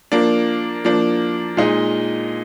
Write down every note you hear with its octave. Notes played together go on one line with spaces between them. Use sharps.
F3 A#3 D4
F3 A#3 D4
A#2 G#3 D#4